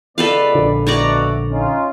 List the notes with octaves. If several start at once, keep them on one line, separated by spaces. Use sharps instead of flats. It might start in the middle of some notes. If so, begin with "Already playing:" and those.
C#2 B3 A4 B4 D5 F5
A#1 D3
B2 A3 F#4 D5 A#5 C#6
C#4 D#4 F4